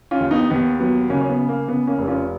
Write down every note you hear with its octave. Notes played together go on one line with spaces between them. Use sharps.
C#4 F4
D#2
B3 D#4
D#2 B3
F#3 B3
C#3 A#3 C#4
C#4
B3
C#3
A#3
C#3 B3
A#3 C#4
F1
C#4 F4